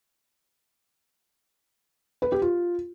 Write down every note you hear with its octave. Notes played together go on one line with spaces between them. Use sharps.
B4
G4
F4